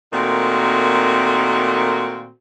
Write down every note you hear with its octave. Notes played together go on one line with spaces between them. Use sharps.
A#2 D#3 A3 C4 F#4